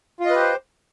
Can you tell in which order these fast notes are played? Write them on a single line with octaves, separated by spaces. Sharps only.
F4 D#5 B4 G4 C5